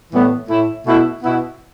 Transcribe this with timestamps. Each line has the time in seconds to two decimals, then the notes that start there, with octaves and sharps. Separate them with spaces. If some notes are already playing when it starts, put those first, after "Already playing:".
0.11 A2 E3 G3 B3
0.49 A2 A3 E4
0.85 B2 A3 E4
1.23 B2 B3 E4